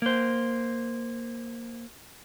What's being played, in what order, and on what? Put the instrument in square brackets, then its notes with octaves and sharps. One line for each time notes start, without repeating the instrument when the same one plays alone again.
[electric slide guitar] A#3 C5